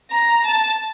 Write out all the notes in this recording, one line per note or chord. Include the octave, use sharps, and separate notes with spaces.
A#5
A5